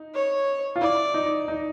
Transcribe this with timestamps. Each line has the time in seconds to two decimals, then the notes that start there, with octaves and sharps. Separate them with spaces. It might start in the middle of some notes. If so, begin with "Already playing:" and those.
Already playing: D#4
0.14 C#5
0.76 F4
0.81 E4 D5
1.14 D#4
1.48 D#4